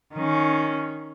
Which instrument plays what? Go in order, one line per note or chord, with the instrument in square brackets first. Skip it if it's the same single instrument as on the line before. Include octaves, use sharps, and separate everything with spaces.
[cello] D#3 C#4